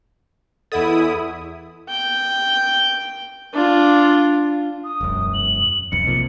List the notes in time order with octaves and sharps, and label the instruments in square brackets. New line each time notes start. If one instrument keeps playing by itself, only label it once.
[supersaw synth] E2 E4 D#6 [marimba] A4 D#5 F#5
[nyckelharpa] G5
D4 F4
[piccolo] D#6
[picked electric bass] E1 F#2
[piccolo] F#7
[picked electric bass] B1 F2 [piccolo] C#7
[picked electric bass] C3 F3 A#3